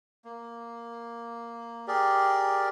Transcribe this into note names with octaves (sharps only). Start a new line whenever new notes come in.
A#3
G4 G#4 A#4 D5